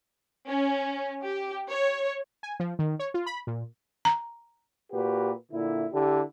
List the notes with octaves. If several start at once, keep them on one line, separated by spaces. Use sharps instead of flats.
C#4
G4
C#5
G#5
F3
D#3
C#5
F4
B5
A#2
A#5
A#2 F#4 G4 B4
A#2 D3 E4
D3 E4 G4